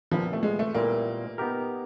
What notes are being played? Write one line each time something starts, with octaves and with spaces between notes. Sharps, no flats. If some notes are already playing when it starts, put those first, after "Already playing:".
A#2 F3 G3 B3 E4
A3
G#3
A3
A#2 G3 A#3 B3 E4
B3 D#4 G4 A#4